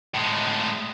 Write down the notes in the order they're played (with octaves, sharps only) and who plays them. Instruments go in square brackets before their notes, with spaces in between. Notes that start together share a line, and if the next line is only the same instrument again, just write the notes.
[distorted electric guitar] A2 G#3